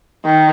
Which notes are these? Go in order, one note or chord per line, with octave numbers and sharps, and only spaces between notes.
D#3